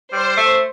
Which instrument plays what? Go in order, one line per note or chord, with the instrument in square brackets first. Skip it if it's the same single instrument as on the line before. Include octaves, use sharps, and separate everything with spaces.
[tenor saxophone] G3 [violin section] C5
[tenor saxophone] A3